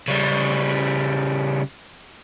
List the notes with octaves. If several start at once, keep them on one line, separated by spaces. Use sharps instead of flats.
C#3 G3